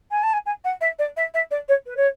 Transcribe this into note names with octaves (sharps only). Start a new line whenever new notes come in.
G#5
A5
G#5
G#5
F#5
E5
D5
E5
E5
D5
C#5
B4
C#5